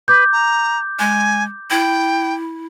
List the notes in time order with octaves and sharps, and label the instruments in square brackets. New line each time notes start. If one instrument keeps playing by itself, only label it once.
[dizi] B4 [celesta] D6 G6
[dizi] A#5
[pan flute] G#3 [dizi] G#5
[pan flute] E4 [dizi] G5